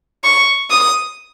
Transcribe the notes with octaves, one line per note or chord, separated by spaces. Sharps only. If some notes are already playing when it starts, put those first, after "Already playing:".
C#6
D#6